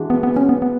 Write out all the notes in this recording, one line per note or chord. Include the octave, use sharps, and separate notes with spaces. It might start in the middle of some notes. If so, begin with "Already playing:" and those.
Already playing: E3 G#3 D4 F#4
B3
B3
C#4
B3
B3